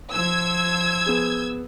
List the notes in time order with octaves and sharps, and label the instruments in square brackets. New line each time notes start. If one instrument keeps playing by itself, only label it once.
[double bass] F3 [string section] E6 G#6
[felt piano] B3 G#4